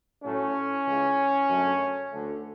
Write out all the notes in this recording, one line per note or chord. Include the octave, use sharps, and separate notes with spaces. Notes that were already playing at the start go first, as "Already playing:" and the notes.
A2 F#3 A3 C#4
C#2 C#3 E3
F#2 D3 F#3 A3
D2 D3 A3